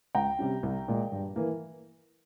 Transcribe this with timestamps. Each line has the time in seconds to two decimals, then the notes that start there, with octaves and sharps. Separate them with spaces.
0.15 C#2 G5 A#5
0.39 C3 G3 C#4
0.63 C2
0.88 A#2 G#3
1.12 G2
1.36 E3 A#3